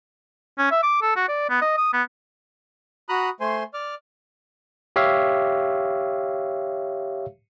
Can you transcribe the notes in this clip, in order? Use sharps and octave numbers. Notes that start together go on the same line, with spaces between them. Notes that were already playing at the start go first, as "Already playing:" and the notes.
C#4
E5
D6
A4
F#4
D5
B3
D#5
D#6
B3
F#4 A#5 B5 D#6 F#6
A3 C5 G#5 C6
D5 D6 F6
G4 C#5 E5 F5